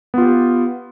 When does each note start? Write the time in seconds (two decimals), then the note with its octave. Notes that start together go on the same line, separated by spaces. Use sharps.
0.14 B3
0.18 F4
0.22 G4